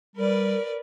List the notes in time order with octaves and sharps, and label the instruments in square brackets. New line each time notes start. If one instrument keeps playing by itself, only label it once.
[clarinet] G3 [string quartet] A#4 B4 D5